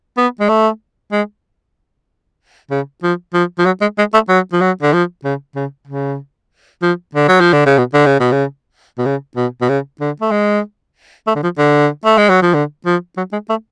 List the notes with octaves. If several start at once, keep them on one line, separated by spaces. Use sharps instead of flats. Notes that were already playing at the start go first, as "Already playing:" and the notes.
B3
G#3
A3
G#3
C#3
F3
F3
F3
F#3
G#3
G#3
A3
F#3
F3
F#3
D3
F3
C#3
C#3
C#3
F3
D3
F#3
F3
D3
C#3
B2
D3
C#3
B2
C#3
B2
C#3
B2
B2
C#3
D3
A3
G#3
A3
D3
F3
D3
A3
G#3
F#3
F3
D3
F3
F#3
G#3
A3